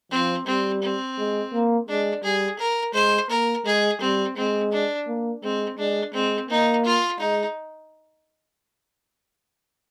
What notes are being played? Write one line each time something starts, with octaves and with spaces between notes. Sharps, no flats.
F3 C4
G3 C4
C4
G#3
A#3
G#3 D4
G3 G#4
A#4
G#3 C5
A#3 A#4
G#3 G#4
G3 C4
G#3 C4
D4
A#3
G#3 C4
G#3 D4
G#3 C4
A#3 D#4
F4
G#3 D#4